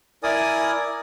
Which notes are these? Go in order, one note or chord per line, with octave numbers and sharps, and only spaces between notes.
E4 A#4 D5 G#5 D#6